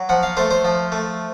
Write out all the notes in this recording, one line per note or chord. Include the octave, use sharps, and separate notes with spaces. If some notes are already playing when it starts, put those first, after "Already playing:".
Already playing: F#3
F3 F#5
F5
A3 C5
C5
F3
A3